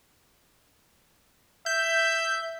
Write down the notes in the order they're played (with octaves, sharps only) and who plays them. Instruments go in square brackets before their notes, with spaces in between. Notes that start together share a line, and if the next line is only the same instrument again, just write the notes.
[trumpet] E5 [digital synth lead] G6